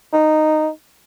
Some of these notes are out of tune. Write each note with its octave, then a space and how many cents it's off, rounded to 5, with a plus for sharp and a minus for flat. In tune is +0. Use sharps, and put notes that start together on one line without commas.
D#4 -10